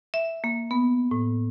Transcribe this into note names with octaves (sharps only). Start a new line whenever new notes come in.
E5
A#3
B3
A2